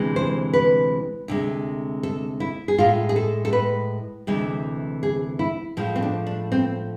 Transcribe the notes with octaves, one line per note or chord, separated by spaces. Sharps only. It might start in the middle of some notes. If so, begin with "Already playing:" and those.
Already playing: D2 C3 E3 G#3
C5
B4
D2 C3 G#3
A4
E4
G#4
A2 G#3 F4
G#4
A4
A4
B4
D2 C3 E3 G#3
G#4
E4
A2 F3 G#3
C4
D4
D4
C4